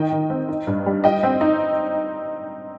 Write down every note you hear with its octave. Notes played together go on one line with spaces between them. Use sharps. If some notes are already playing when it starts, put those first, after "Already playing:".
Already playing: D#3 D#5 G5
D#3
C4
D#4
G2
G3
G3 D#5 G5
C4
D#4